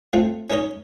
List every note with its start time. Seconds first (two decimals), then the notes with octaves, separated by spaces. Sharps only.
0.13 A3 C4 F4
0.50 C#4 D#4 A#4 C#5 D#5